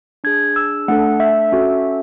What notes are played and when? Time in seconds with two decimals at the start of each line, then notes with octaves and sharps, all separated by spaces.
0.24 D4 G#4 G#6
0.56 E6
0.88 A3 D4 A4 F#5
1.20 E5
1.52 C#4 F#4 A4